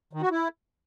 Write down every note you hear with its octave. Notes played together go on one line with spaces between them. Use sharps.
D#3
F#4
E4